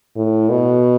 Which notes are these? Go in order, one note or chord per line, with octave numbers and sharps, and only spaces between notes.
A2
B2